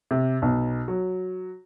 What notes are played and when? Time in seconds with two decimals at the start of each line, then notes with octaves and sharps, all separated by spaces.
0.11 C3
0.42 B1
0.88 F#3